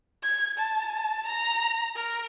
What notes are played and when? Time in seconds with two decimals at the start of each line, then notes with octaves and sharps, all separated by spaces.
0.23 G#6
0.58 A5
1.26 A#5
1.96 A#4